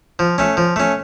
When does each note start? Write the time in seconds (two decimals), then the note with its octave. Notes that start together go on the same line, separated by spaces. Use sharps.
0.19 F3
0.38 A3 C#4
0.57 F3
0.76 A3 C#4